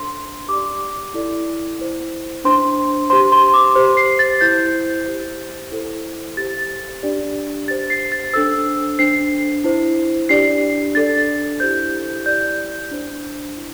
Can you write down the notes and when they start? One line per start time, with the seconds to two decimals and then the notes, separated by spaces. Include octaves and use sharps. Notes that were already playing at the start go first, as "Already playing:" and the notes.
Already playing: D4 A4 C5 C6
0.48 G4 D5 D6
1.14 E4 A4 D5
1.79 E4 C5
2.44 D4 C5 C6
3.10 G4 C5 C6
3.32 C6
3.54 D6
3.76 G4 C5
3.97 C7
4.19 A6
4.41 E4 C5 G6
5.06 G4 C5
5.71 E4 A4 C5
6.37 G4 C5 A6
7.03 D4 G4 D5
7.68 G4 C5 A6
7.90 C7
8.12 A6
8.33 D4 A4 C5 E6
8.99 D4 C5 C7
9.64 E4 C5
10.29 D4 G4 D5 C7
10.95 D4 A4 D5 A6
11.60 E4 G4 C5 G6
12.26 E4 G4 D5 G6
12.91 D4 C5
13.56 E4